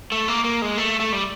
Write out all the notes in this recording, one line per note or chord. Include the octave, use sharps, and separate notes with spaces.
A3
A#3
A#3
G#3
A3
A3
G3